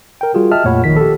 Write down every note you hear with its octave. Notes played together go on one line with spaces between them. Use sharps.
A#4 G5
G3 F4 F#4 G#4
D#5 E5 G5 A5 D#6 F6
F2 A#2 A3 C#5 F#5 B5
A#1 D#3 B6
G4 A4